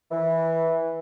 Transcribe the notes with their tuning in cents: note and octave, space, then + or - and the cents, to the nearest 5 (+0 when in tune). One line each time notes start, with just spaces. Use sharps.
E3 -10